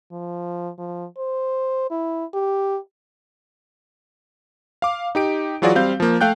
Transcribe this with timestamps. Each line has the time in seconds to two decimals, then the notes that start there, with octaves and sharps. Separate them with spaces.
0.12 F3
0.78 F3
1.17 C5
1.91 E4
2.34 G4
4.82 F5 D6
5.15 D#4 G4 D7
5.62 E3 F#3 F4 F#4 G#4 D5
5.75 G3 C4 F5 G6
6.00 F3 A#3
6.21 A3 F5 G5 F#6 G6